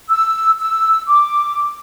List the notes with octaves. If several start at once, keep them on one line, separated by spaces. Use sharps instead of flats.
E6
E6
D6